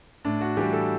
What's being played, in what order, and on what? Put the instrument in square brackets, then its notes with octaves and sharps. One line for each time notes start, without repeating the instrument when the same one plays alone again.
[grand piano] A2 D4
F#4
E3 G3 G4
A4